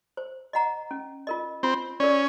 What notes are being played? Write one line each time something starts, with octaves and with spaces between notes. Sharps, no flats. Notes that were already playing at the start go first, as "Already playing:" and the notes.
C5
D#5 F#5 A#5
C#4
F4 A#4 D#5
C4 F4
C#4 A#4 D5